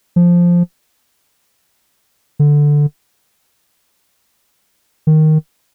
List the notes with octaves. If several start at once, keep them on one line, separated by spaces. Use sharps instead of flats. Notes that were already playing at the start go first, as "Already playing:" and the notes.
F3
D3
D#3